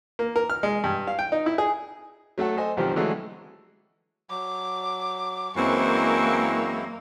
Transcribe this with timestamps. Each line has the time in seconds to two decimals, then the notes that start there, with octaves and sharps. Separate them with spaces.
0.19 A#3
0.36 A#4
0.50 F6
0.63 G#3
0.84 G2
1.07 F5
1.19 G5
1.32 D#4
1.46 E4
1.58 G#4
2.38 F#3 A3 A4 F#5
2.57 A4 C5 D#5 G#5
2.77 B1 D#3 F3 G3 C4 G4
2.96 D3 E3 F#3 G#3 A3
4.30 F#3 D6
5.57 F#2 E3 G#3 A#3 C4 E4 C#6